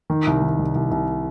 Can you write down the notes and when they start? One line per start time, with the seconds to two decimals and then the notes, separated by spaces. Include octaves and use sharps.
0.10 D#3
0.27 C2
0.42 D#3
0.59 C2
0.75 C2
0.91 C2